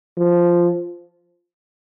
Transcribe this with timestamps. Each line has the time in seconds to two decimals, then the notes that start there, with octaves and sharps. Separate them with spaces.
0.17 F3